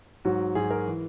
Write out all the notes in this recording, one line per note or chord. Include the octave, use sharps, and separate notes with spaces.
G#2 F#3 F#4
G#2 F#3 G#4
A#4
E3